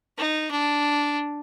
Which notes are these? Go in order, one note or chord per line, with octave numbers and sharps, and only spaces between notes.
D#4
D4